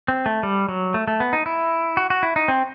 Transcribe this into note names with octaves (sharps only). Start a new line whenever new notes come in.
C4
A3
G3
F#3
A3
A3
B3
D#4
E4
F#4
F#4
E4
D#4
C4